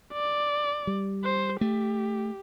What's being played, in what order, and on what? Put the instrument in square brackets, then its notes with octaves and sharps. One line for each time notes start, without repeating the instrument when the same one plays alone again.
[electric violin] D5
[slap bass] G3
[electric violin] C5
[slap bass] A3 [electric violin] G4